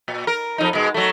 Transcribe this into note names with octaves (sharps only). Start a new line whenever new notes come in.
A#2
A#4
F2 D#4
B2 G#3
F#3 A3